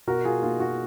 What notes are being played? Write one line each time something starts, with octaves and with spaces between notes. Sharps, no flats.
B2 F#4 A#4
F4 G#4
A#3 D#4 F4
F#4